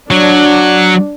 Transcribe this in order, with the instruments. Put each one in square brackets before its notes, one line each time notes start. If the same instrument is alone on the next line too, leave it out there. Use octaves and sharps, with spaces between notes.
[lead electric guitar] F#3 F#4 [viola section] D4